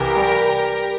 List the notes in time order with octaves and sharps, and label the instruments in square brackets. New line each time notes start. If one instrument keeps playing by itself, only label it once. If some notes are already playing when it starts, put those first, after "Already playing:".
Already playing: [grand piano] C2 E3 [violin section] G4 A#4
[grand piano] G3